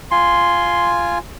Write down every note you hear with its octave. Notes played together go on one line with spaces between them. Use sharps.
F4 G#5 C6